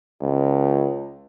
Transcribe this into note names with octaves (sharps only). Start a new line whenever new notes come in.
C#2